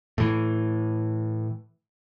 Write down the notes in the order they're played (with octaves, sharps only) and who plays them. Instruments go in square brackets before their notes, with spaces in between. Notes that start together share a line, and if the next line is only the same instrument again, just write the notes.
[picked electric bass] A2 E3